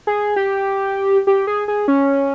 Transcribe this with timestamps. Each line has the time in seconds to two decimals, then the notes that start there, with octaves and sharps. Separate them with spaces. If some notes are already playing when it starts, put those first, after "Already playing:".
0.07 G#4
0.36 G4
1.27 G4
1.47 G#4
1.68 G#4
1.88 C#4